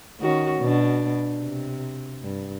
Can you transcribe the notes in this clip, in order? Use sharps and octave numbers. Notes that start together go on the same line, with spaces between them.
D#3 C#4 F#4
B2 D4
C3
G2